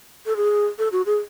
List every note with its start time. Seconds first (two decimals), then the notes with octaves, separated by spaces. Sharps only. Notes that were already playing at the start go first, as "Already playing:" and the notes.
0.26 A4
0.37 G#4
0.79 A4
0.92 F#4
1.06 G#4